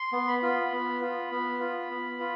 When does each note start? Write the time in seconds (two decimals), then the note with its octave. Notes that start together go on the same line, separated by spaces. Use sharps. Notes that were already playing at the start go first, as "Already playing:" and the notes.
Already playing: C6
0.13 B3
0.28 B5
0.42 F4
0.72 B3
1.02 F4
1.31 B3
1.60 F4
1.90 B3
2.20 F4